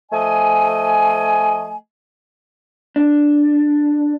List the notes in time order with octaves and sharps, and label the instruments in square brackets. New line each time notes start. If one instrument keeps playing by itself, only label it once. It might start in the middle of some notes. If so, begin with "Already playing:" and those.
[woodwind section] F3 A3 D#5 G#5
[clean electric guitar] D4